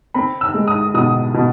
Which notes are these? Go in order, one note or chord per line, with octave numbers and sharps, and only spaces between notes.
C4 B5
E6
G#3
D#6
B2 D#6
B2